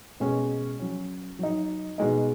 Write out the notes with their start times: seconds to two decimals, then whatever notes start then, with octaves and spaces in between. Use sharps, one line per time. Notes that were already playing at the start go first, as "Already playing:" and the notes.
0.20 B2 G#3 C#4
0.79 F#3 C#4
1.39 F#3 D#4
1.98 B2 G#3 D#4